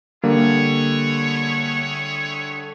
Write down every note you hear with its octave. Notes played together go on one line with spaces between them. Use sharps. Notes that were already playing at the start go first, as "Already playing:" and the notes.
D3 G3 A#3 E4 G#4 C#5